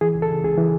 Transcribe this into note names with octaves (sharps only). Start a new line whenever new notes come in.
E3 G#4
C#2
A4
C#3
C#2 G#4
E3